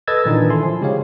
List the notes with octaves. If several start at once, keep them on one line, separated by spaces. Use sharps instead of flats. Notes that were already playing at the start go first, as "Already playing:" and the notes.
A4 B4 D#5 E6 G#6 A6
A#2 D#3 E3 D4 D#4 F4
E4 A4 G#5 C6
F3
C#3 G#3 G4 G#4 C#5 F5